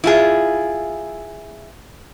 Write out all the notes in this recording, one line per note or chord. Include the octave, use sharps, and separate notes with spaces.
E4 F4 G#4